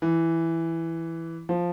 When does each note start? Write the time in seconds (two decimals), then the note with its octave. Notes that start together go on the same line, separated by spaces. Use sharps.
0.02 E3
1.49 F3